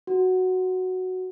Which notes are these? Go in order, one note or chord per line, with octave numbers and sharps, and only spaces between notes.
F#4